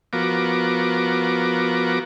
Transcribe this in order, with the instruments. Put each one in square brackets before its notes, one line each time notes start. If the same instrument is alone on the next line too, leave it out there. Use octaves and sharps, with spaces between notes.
[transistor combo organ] F3 B3 F#4 A#4 D6